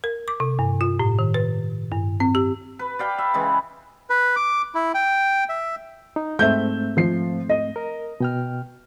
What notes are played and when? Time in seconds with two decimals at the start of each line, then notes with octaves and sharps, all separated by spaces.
0.04 A#4
0.28 D6
0.40 C3
0.59 G2
0.81 F4
0.99 A2
1.19 D#3
1.34 B4
1.91 G2
2.20 C4
2.35 G4
2.79 B4
2.99 D5 F5 G5 B5
3.18 E5
3.34 C#3 E3 G#3
4.10 B4
4.36 D6
4.75 E4
4.94 G5
5.49 E5
6.16 D#4
6.39 G#2 A3 C4 E5 G6
6.97 F3 C7
7.49 D#5
7.76 A#4
8.20 B2 G5 F6